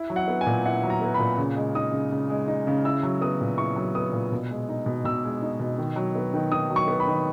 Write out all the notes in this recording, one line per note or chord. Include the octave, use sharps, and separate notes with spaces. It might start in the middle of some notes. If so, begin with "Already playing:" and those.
Already playing: E4
F#3
F#5
B3
G#5
A#2
E4 F#5
F#3
A#5
B3
B5
A#2
C#3
G#3
D#4 D#6
C#3
C#3
G#3
D#4
C#3
E4 E6
F#3
B3 D#6
A#2
E4 C#6
F#3
B3 D#6
A#2
B2
G#3
D#4
B2
B2 E6
G#3
D#4
B2
D#3
F#3
B3
D#3
D#3 D#6
F#3
C#6
B3
B5
D#3